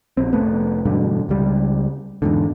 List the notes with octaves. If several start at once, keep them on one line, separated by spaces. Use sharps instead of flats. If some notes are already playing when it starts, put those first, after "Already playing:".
A#1 C4
F1 A3 B3
E1 G2 B2 D3
C#2 G3
E2 G#2 D3